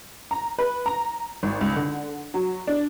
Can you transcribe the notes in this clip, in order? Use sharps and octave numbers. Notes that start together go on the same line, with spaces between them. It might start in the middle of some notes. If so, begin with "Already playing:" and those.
A#5
B4
A#5
G#1
C#2
D3
F#3
D4